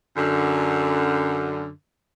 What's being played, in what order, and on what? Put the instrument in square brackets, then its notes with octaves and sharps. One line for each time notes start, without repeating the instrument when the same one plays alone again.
[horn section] F#2 D3